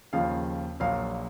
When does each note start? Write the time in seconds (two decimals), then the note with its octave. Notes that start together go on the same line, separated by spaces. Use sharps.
0.13 D#2 C#3 F3 F5
0.80 A#1 A#2 F#3 F5